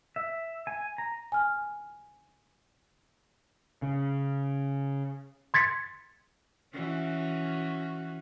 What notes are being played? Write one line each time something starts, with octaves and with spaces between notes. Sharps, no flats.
E5
G#5
A#5
G#5 F6
C#3
C6 G#6 A6 B6 C#7
E3 C#4 F#4